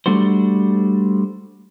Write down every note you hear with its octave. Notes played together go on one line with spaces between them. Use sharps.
G3 A3 D4 F#4 C5